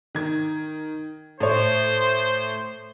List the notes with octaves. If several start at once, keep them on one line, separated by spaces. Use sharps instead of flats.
D#3 G#6
A2 C5 C#5